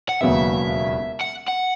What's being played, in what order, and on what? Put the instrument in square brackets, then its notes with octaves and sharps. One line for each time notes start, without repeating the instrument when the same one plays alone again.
[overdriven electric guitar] F#5
[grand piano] E1 D#2 C#3 F#3 B3 [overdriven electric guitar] E5
[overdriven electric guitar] F#5
F#5